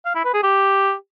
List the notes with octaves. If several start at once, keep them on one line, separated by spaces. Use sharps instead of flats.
F5
E4
B4
G#4
G4